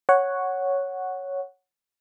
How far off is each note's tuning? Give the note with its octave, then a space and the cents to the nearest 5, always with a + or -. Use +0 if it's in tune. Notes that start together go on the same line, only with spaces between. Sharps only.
C#5 +0 F#5 +0